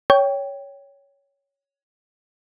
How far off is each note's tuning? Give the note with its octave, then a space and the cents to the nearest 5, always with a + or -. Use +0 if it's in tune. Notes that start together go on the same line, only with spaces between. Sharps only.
C#5 +10 G5 +0